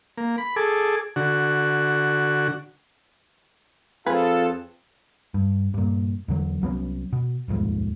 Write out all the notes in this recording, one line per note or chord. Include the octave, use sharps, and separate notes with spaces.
A#3
B5
G#4 A4 D6
D3 F#4
F2 C4 F4 G#4 A4 B4
G2
G2 A#2
E2 D3 F#3
C2 F#3 B3 C#4
B2
D#1 B1 F2 G#2